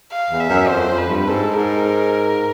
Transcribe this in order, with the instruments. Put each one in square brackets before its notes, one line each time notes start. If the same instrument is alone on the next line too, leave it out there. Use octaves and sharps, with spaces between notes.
[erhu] F5
[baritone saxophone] E2
[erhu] E5
[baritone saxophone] F#2
[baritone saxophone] F2 [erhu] C5
[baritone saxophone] F2
[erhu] B4
[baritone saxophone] G2
[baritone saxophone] G#2 [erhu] A4
[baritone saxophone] G#2 [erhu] A#4